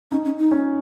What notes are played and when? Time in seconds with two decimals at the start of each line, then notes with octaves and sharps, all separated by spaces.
0.11 C#4 D#4
0.25 C#4
0.38 D#4
0.51 C#4